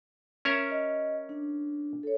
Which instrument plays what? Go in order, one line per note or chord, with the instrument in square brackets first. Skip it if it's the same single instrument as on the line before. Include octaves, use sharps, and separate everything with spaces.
[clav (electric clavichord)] C#4 A#4 E5
[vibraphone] D#5
D4
A4 C#5